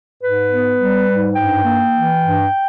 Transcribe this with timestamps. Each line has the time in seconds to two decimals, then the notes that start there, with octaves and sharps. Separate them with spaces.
0.21 G#2 B4
0.50 B3
0.79 G3
1.07 G#2
1.36 G2 G5
1.64 A#3
1.93 E3
2.21 G2